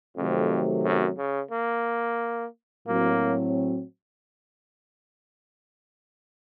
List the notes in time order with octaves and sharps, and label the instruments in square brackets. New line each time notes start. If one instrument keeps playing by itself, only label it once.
[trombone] F2 [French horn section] C3 D#3 F#3 A3 C4
[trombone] F#2
C#3
A#3
[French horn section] A2 F#3 C4 [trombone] A#3